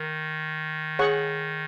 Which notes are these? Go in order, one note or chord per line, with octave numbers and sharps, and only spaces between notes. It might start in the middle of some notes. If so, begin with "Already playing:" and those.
Already playing: D#3 A#4
G#4 C#5 F#5 C#6